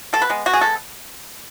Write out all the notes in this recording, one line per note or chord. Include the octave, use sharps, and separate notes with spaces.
B2 A4
B4
G#3 B3
B2 F#4
G#4
G#3 B3 A4